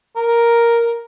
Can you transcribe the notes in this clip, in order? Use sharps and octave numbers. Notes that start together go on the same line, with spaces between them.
A#4